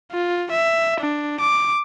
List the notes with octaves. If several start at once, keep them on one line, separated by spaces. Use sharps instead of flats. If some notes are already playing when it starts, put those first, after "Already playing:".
F4
E5
D4
D6